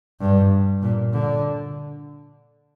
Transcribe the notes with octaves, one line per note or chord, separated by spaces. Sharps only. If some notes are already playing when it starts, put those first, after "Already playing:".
G2
A#2
D3